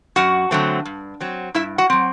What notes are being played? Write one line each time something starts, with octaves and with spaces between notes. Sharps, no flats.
F#2 F#4 F#5
D3 F#3 A3 C4
G2
F#3 C4
G2 E4 E5
F#4 F#5
F#3 C4